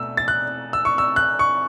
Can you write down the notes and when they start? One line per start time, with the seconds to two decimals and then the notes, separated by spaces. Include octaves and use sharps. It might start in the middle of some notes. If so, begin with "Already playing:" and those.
Already playing: B2 A3 E6
0.17 A6
0.28 F#6
0.73 E6
0.85 C#6
0.98 E6
1.16 F#6
1.39 C#6